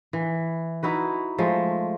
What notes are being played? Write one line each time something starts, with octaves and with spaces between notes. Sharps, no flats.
E3
D#4 E4 F#4 B4
F3 G#3 A3